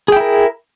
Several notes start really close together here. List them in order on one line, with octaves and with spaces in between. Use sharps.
G#4 G5 E4 A#4